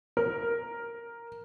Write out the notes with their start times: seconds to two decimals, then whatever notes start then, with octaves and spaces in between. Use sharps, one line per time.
0.17 A#4